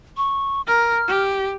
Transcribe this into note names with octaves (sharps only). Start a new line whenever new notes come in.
C#6
A#4 F6
G4